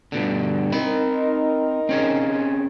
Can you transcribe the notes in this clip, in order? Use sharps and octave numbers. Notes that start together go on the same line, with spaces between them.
G2 B2 D3
C4 D#4 A#4 B5
C4 C#4 G#4